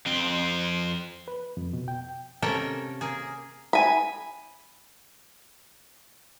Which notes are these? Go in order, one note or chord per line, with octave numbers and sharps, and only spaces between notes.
F2 C4
B4
F2
B2
G5
C3 A#3 C#4 A4 A#4 G5
A#3 G#4
G#5 B5